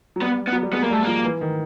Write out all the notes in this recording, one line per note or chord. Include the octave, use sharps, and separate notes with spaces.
F#3
G3 B3
B3
F#3
G3
G#3 B3
A#3
G3 A3
F3 A#3
E3
D#3